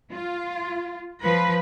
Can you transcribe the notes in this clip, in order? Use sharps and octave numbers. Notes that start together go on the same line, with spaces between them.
F4
F3 B4